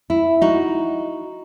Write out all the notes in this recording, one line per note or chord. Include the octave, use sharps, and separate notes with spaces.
E4
D#4 F#4